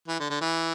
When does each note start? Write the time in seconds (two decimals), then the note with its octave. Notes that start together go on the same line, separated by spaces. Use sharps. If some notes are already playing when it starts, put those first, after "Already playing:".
0.08 E3
0.20 D3
0.30 D3
0.41 E3